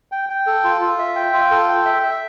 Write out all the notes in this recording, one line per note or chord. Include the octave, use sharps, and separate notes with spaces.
G5
G5
A4
F4
F4
E5
G5
F4
A4
G5
E5
E5